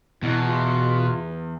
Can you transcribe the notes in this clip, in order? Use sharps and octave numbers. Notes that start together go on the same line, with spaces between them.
E2 B2 E4
F4